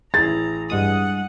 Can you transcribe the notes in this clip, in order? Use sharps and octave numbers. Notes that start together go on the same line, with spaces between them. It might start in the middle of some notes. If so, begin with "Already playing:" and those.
A1 E4 G#4 A#5 A6
G2 G#3 F#5 D#6